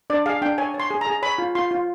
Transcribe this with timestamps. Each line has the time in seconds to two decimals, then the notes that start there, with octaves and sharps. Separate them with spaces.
0.10 D4 D5
0.26 G#4 F5
0.42 D4 G5
0.58 C#5 G#5
0.74 C#5
0.80 C6
0.90 G#4
1.01 A#5
1.07 G#4
1.22 C#5 B5
1.38 F4
1.55 F4 C6
1.71 F4